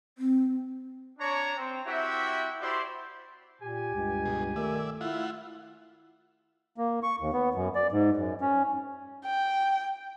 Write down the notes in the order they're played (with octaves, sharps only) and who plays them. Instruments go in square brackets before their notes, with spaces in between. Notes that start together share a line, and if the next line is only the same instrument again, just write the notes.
[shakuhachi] C4
[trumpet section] D4 C#5 A#5
C4
C4 E4 F#4 G4 E5
E4 F#4 G4 C5 D5 C6
[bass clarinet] A#2 [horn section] G4 G#5
[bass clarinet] C#2 [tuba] G2
[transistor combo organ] B2 G#4
[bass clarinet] D#3 [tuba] A3 [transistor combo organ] D5 E5
[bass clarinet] E4 [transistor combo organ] F4 E5 F#5
[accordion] A#3
C#6
D#2
B3
F#2
D5
G#2
F#2
C#4
[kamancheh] G5